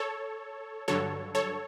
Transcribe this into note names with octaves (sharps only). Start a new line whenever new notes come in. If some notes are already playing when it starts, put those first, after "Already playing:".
Already playing: A4 C#5
G2 D3 F#3 A4 C#5
A4 C#5